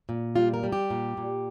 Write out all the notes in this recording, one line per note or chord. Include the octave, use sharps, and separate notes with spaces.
A#2
G3 F4
A#4
G3
G4
A#2
A#2